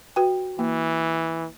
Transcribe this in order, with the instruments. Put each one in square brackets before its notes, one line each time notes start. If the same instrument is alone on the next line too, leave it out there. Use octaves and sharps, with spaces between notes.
[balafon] F#4 B4 G5
[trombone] E3 [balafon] A#3